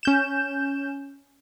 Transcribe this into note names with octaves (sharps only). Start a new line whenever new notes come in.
C#4 G6 E7